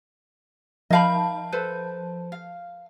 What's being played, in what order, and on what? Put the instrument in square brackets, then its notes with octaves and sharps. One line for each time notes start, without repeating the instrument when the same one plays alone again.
[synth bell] F3 A5 [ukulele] D#5 F5 B5
[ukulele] A4 B4 C5
F5